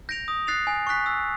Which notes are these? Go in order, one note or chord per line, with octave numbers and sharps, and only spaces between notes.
G6 A#6 D7 F7
D#6
F#6 A6 C7 F7
G#5
C#6 F#6 B6
E6